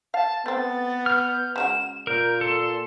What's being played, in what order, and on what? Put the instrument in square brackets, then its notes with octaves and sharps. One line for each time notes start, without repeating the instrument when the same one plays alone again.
[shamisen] F5 [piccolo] A5
[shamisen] A3 C4 [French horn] B3 [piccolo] A6
[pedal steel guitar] F6 [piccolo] G6
[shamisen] C#3 G#3 F#4 [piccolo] E7
[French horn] A#2 [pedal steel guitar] A#4 [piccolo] G6
[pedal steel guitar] A4 [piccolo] C6